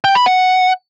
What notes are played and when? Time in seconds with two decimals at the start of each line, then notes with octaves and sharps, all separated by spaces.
0.04 G5
0.15 B5
0.26 F#5